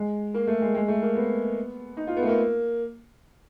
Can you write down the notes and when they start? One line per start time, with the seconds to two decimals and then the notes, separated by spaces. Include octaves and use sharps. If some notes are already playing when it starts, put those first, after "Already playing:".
Already playing: G#3
0.34 A#3
0.47 A3
0.61 G#3
0.75 G#3
0.88 A3
1.02 A#3
1.15 B3
1.97 D#4
2.07 F4
2.17 B3
2.23 A3
2.28 A#3